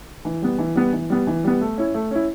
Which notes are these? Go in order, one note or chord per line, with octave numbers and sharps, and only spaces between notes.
E3
G3 B3
E3
G3 B3
E3
G3 B3
E3
G3 B3
A3
C#4 E4
A3
C#4 E4